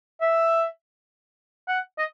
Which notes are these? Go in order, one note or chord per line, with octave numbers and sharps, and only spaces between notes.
E5
F#5
D#5